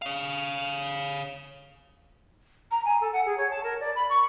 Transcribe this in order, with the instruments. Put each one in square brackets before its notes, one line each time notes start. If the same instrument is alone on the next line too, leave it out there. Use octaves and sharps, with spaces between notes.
[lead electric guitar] C#5 F5
[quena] A#5
G#5
A4
F#5
G#4
C#5
A5
A#4
D5
B5
C#6